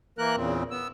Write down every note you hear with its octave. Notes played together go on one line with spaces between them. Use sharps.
E3 A#3 A#4 F#6
E2 A#2 C#3 C4
B3 E6